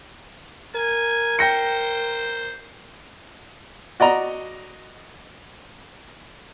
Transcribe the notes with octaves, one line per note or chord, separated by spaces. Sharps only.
A#4 G#5
C5 G5 A#6 C#7
F#4 D5 D#5 A#5